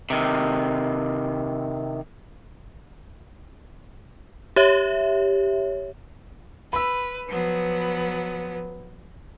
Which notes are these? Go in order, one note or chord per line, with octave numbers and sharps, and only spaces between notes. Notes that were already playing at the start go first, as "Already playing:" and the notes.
C3 D#3
G4 C#5 E5
B4 B5 E6
F3 F#3 B3 B4